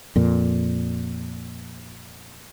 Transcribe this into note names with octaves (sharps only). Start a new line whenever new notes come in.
F2 A#2